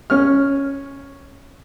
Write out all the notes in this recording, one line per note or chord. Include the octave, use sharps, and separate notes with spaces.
C#4 F6